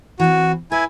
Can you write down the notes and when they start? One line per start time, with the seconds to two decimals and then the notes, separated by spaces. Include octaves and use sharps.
0.20 E3 C4 F#4
0.72 E4 B4 G#5